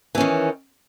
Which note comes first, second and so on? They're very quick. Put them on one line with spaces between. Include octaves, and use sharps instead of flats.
E3 C#4 D#3